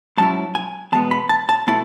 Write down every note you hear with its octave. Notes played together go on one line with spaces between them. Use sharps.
G#2 F#3 C#4 E4 A5
G#5
E2 B2 G#3 B3 A5
B5
A5
A5
B2 A3 E4 A5